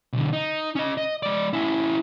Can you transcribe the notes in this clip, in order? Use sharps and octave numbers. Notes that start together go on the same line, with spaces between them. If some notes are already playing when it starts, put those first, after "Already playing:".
B1 D3
D#4
C#4 D#5
D#5
G#3 D5
C#4 E4